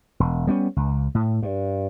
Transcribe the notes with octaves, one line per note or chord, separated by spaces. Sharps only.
E1
G3 B3 C#4
C#2
A2
G2